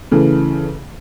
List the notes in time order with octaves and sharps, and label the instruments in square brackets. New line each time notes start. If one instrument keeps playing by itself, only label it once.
[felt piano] C#3 E3 A3